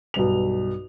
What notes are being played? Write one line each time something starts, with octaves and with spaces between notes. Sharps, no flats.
B1 G2 F7